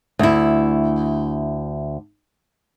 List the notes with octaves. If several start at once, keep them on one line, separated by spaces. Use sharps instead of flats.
D2 E4